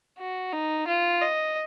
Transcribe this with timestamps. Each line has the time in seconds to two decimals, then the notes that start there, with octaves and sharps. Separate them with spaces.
0.19 F#4
0.53 D#4
0.87 F4
1.22 D#5